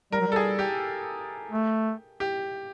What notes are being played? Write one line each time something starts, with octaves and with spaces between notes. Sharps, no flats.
G3 A#4
F#3
G3 A4
G#4
G4
A3
G4